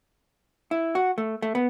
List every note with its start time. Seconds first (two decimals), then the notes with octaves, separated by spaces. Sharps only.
0.71 E4
0.95 F#4
1.18 A3
1.42 A3
1.55 B3